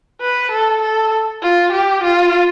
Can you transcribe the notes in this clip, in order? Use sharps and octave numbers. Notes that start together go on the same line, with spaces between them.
B4
A4
A4
F4
G4
F4